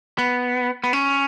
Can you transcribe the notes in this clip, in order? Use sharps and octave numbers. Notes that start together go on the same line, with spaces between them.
B3
B3
C#4